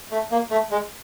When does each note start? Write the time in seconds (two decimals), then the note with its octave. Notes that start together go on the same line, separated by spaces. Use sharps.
0.11 A3
0.31 A#3
0.51 A3
0.71 G#3